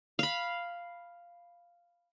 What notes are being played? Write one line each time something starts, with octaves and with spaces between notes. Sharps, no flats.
F5 B5